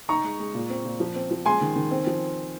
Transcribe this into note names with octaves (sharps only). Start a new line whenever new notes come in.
D#4 A#5 C#6
G#3
G#3
A#2
C4
A#2
F3
C4
F3
G#3 G#5 C6
D#3
D#3
C4
F3